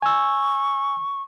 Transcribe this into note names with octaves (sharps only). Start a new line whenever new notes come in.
G#5 C#6 E6